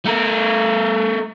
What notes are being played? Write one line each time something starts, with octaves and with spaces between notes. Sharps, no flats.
A3 A#4